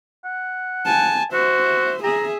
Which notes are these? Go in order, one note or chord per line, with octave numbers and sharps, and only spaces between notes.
F#5
G#5 A5
F#4 C5 E5
G#4 E5 A#5